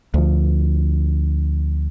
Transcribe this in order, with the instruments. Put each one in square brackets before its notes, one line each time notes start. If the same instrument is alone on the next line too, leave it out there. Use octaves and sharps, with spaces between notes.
[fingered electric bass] D2 F3